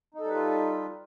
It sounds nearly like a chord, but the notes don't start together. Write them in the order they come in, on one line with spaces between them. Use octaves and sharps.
D#4 A4 G3 B4 F4